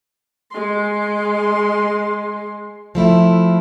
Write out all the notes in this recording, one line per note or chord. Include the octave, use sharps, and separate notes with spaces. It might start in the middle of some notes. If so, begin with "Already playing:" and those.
G#3 C6
F3 A3 E4